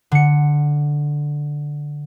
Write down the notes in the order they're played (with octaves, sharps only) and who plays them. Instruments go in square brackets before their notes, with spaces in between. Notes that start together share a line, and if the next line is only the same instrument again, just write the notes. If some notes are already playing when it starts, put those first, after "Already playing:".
[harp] D3 C#7